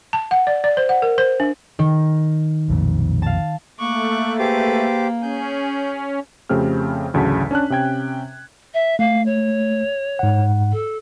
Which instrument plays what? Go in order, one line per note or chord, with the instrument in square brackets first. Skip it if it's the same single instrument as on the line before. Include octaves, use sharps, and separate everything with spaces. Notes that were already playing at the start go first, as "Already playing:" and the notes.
[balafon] A5
F#5
D5
D5
C5
F#5
A#4
C5
D4
[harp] D#3
[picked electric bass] B1 F2 A#2
[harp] F5 A5
[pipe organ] A3 [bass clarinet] A#3 [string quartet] C#6 D6 F#6
[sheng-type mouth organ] G4 C5 D6 [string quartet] G#4 B4 A6
[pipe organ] C#4 [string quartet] G#4 [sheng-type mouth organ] G6
[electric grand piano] F2 C#3 A3 C4 G4 F6
A1 D2 C#3 F#3 A5 B6
C#4 D4 A5 F#6
C3 C#4 G5 G#6
[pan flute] E5
[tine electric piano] A3 [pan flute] F5
[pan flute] C#5
[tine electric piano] G#2 F#5
[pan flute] A4